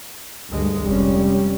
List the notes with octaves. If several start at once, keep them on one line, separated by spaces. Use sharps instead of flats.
D2 G2 G#3
F1 G3 C#4